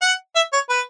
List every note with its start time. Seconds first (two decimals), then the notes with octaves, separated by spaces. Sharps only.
0.02 F#5
0.36 E5
0.53 C#5
0.69 B4